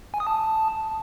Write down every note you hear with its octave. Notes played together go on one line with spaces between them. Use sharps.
G#5
D#6
A5